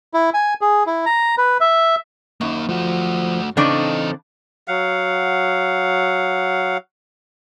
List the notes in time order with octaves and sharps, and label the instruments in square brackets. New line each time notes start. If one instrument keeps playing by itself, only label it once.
[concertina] E4
G#5
G#4
E4
A#5
B4
E5
[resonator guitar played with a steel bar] F#2 [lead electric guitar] A#3 D#4
[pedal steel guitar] F3 [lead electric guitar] A3 F#4
[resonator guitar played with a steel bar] A2 C#3 D4 [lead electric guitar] E3 D#5 [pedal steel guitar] C4 D#4 A4
[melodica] F#3 F5 F#5